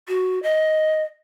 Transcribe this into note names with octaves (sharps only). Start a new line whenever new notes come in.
F#4
D#5